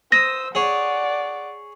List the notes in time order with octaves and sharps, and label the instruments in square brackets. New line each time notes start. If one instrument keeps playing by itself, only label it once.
[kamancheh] C5 E6 [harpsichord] D#6 [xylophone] A#6
[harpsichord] G#4 C#5 [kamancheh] D5 F#5